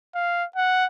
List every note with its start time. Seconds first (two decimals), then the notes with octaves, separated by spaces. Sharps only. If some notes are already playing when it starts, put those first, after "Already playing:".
0.15 F5
0.56 F#5